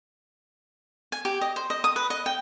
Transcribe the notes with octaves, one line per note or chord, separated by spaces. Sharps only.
G#5
G4
D#5
C5
D#5
D#6
B4
D#5
G5